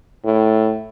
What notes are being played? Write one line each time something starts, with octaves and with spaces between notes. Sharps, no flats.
A2